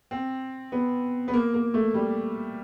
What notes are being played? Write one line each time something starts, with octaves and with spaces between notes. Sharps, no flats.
C4
B3
B3
A#3
A#3
A3
G3